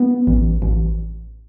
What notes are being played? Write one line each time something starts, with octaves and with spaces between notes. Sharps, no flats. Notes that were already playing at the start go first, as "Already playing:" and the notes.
Already playing: B3
A1
A1